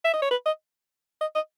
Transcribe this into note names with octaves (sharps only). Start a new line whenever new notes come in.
E5
D#5
C#5
B4
D#5
D#5
D#5